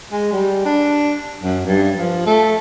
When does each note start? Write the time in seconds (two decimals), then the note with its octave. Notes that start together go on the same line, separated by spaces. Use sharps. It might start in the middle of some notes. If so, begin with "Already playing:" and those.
0.12 G#3
0.32 G3
0.65 D4
1.43 F#2
1.66 G2
1.97 F3
2.26 A3